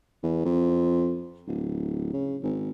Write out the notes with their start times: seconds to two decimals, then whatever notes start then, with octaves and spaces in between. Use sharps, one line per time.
0.23 E2
0.45 F2
1.47 D1
2.14 C#3
2.43 G#1